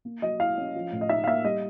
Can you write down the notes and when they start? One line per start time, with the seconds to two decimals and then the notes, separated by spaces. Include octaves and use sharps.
0.05 A#3
0.22 F#3 D#5
0.40 E4 F5
0.57 C#4
0.75 F3
0.92 A2
1.01 D#5
1.09 D#4 E5
1.24 F5
1.27 A#3 E5
1.44 G3 D#5